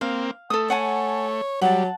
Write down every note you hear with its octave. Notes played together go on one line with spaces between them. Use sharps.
A#3 C4 F5
A3 A4 D#6
C#5 F#5 G#5 A5
F#3 G3 F#5 A5